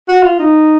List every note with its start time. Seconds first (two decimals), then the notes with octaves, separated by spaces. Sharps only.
0.09 F#4
0.23 F4
0.39 D#4